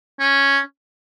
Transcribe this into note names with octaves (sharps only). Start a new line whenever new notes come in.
C#4